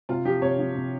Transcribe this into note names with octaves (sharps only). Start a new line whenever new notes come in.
C3 F4
F3 G4
C3 C#5
F3
C3